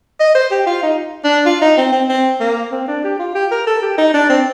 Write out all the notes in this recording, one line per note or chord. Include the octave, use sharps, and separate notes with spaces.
D#5
C5
G4
F4
D#4
D4
F4
D#4
C4
C4
C4
A#3
C4
D4
G4
F4
G4
A#4
A4
G4
D#4
D4
C4